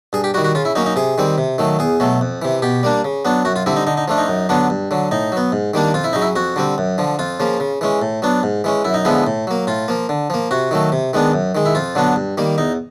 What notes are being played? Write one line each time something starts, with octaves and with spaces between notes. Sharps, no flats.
G2 G#4
G4
D#3 G3 F#4
F#4
C#3 F4
E4
F#3 A#3 C#4 D#4
D#4
C3 G#4
D#3 G3 C4
C3
D#3 F#3 A3
E2 G#4
B2 F#3 A3
F2
C3 E3
B2 G4
G3 A#3 D4
C#3
F#3 B3 D4
F#2 F#4
F4
D3 G3 C4 E4
D#4
D3 D#4
D#4
F3 A3 D4
D#4
F#2
D3 F#3 B3 D4
G2
D3 F#3
A2 D#4
F#3 B3
G#2
D#3 G3 A#3 D4
F2 F4
E4
C#3 F#3 D#4
E4
F2 F#4
D3 G3 C4
F#2
D3 F3
F2 F4
C#3 F3 A#3
C#3
E3 G#3 C#4
A2
F#3 B3 D4
G#2
E3 G#3 C#4
F#2 E4
D#4
D3 F3 G#3 B3 E4
A2
F#3 A#3
A2 F4
F3 A#3
D3
F3 A#3
C3 F#4
D#3 F#3 A3
C3
D#3 G#3 B3 D4
F#2
D#3 G#3
E4
F2 F4
D3 F#3 B3 D4
G2
D#3 G3 A#3
E2 D#4